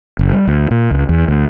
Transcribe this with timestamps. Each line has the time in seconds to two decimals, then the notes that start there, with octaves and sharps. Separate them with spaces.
0.19 F#1
0.33 G3
0.47 D2
0.71 A#2
0.91 C#2
1.09 E2
1.28 D2